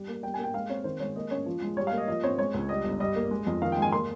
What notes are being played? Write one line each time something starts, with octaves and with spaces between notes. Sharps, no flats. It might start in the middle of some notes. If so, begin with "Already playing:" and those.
Already playing: G3
A#3
G3 G5
A#3 G#5
G5
G#3 F5
C4 C#5
D#3 C5
G#3 C#5
A#3 D#5
C#4 C#5
F3
G#3
G3 C#5
F5
A#3 D#5
F3 D#5
C4 C#5
G#3 C#5
C#2
G3 D#5
G1
G3 D#5
A#3
G#3
F2
D#3 F5
G#3 G5
G#5
A#3 C6